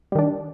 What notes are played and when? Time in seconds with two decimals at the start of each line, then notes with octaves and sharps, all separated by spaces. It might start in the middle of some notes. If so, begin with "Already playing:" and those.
0.12 G3
0.15 D#3
0.19 D4